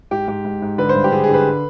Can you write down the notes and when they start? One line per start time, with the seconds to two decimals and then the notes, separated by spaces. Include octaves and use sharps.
0.11 G#2 G4
0.28 G#2 G4
0.45 G#2
0.62 G#2
0.78 D3 B4
0.89 C5
0.95 G2
1.04 G4
1.11 D3 G#4
1.24 D3 G#4
1.34 B4